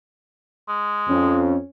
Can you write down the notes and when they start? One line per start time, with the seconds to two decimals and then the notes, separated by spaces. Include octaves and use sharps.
0.68 G#3
1.09 F2 C#4